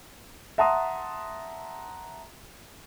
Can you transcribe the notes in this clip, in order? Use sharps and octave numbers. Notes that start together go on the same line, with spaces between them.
E5 F#5 A5 A#5 C6 D#6